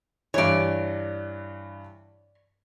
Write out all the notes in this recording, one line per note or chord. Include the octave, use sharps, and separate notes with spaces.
G2 E3 C#5 D5